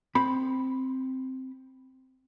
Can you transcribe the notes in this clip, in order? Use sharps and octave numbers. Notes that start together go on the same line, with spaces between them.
C4 B5